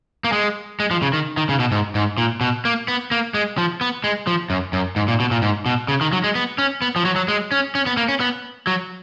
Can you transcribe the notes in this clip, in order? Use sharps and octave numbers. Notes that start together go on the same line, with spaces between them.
A#3
G#3
G#3
F3
C#3
D#3
D#3
C#3
B2
G#2
G#2
A#2
B2
A#3
B3
A#3
G#3
F3
B3
G#3
F3
F#2
F#2
G#2
A#2
B2
A#2
G#2
B2
C#3
D#3
F#3
G#3
B3
C#4
B3
F3
F#3
F#3
G#3
C#4
C#4
B3
A#3
C#4
B3
F#3